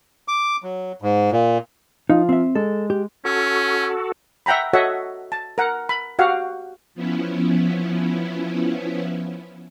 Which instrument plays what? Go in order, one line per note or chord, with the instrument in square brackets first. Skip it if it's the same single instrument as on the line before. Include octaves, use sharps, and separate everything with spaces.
[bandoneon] D6
F#3
G#2
A#2
[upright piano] F3 F4 F5 [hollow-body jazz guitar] D#4
[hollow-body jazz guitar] C4 E5
[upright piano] G#3 [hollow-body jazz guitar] A4
[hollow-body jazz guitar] G4
[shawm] C#4 [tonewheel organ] F#4 A4
[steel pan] E5 F#5 G5 A#5 B5
F#4 A4 C#5 D#5 E5 F#5
A5
A#4 F#5
B5
F#4 G4 F5 F#5
[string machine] F3 B3 C#4 E4